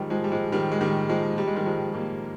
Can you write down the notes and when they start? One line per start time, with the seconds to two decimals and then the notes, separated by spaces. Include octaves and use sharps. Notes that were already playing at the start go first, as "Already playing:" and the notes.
Already playing: D#3 F3 G3 G#3
0.10 F3 G#3
0.24 G3
0.32 F3 G#3
0.52 D#3 G3
0.72 G#3
0.81 D#3 G3
1.09 F3 G#3
1.38 G3
1.47 G#3
1.56 D#3 G3
1.66 F3 G#3
1.94 G3 A#3